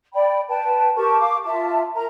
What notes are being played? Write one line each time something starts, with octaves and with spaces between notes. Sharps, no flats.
D5 G5 B5
B4 G5 A5
G4 A#4 A5 C#6
F5 D6
F4 E5 A5
A#4 A#5